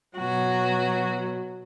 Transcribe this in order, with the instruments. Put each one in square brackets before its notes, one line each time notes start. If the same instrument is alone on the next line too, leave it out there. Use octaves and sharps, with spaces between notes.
[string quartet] B2 F#3 F#4